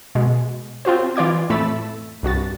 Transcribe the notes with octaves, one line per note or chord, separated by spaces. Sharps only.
B2 G#3
C4 F4 F#4 C5
E3 F4 D5 D6 G#6
F2 A2 A3 B5 E6 A6
C2 G2 F#4 A6